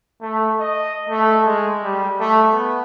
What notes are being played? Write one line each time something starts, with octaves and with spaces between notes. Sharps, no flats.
A3
D#5
A3
G#3
G3
A3
B3